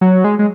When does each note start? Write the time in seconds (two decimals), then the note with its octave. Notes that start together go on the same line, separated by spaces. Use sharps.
0.01 F#3
0.24 G#3
0.39 G#3